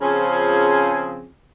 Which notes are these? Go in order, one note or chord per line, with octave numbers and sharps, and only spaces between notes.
C#3 F3 C4 C#4 F4 G#4